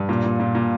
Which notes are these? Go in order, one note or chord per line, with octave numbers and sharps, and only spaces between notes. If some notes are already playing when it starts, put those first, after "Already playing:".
Already playing: G2
A#2
A#2
A#2
A#2